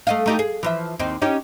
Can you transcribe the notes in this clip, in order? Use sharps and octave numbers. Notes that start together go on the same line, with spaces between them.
A3 D#5 F5
A3 D#4 G4
G#4
E3 F3 E5
D#2 C4 D#4
C#4 D#4 G4